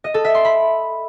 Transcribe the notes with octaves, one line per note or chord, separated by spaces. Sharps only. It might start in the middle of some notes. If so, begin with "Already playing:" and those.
D#5
A4
E5
C6
B5